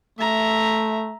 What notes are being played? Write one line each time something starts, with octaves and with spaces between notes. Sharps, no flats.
A3 E5 A#5